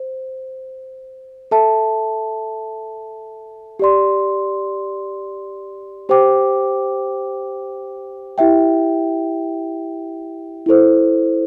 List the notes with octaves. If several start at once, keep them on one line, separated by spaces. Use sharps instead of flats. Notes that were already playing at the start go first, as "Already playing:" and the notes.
Already playing: C5
A4 E5 A5
G4 D5 C6
G4 C5 G5 D6
E4 G4 E5 G5
E4 A4 C5